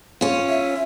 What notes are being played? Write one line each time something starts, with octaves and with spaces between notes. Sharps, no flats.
C#4 F4
E5